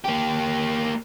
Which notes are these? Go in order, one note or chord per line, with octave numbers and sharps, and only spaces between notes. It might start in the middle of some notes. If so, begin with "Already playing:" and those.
A#3 G4